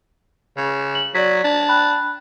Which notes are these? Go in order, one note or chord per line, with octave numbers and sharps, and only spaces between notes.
C#3
F#7
F#3 D5 B6
D4
G5 B5 F#6